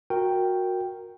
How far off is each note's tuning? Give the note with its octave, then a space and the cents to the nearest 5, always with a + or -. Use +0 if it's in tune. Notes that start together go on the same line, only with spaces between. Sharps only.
F#4 -15 A#4 +0 G5 +0